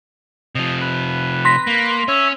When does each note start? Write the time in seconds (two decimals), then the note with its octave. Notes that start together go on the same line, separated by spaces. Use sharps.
0.55 C3 F3 D#5
0.81 B4
1.45 C6 A#6 B6
1.67 A#3
2.08 C#4 C#5 E5